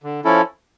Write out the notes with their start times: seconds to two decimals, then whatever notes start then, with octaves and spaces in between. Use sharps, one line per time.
0.04 D3
0.25 F3 C#4 E4 A4